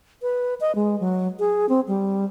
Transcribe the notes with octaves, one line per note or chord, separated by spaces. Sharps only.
B4
D#5
G#3
F#3
G#4
C4
G3